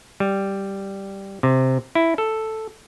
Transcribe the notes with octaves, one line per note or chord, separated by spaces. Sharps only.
G3
C3
E4
A4